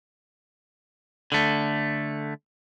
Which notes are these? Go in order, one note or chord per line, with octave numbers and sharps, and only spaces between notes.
D3 A3